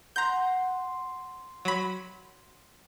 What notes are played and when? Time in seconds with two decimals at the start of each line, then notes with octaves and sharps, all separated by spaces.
0.16 F#5 A#5 C6 G6
1.65 F#3 B5